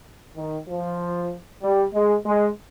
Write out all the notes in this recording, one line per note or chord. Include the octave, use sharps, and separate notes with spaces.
D#3
F3
G3
G#3
G#3